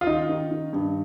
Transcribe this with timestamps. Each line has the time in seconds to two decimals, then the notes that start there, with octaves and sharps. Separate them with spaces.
0.01 F4
0.07 D#3 D#4
0.29 D#3
0.51 D#3
0.73 G2